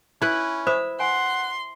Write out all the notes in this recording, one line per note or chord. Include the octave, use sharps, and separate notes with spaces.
C#4 E4 B4
C5 E5 B5 D#6
F#5 G#5 C6